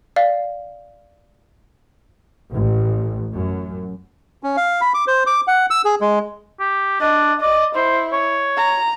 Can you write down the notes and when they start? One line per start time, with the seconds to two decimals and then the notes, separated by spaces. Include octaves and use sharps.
0.16 D5 F5
2.53 A1
3.34 F#2
4.43 C#4
4.57 F5
4.81 B5
4.94 D6
5.07 C5
5.27 D6
5.47 F#5
5.70 E6
5.85 G#4
6.01 G#3
6.59 G4
7.01 D4 D#5
7.41 D5 D#5
7.75 E4 C5
8.12 C#5
8.57 A#5